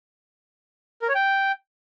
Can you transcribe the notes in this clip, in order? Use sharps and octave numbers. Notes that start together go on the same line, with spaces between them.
A#4
C#5
G5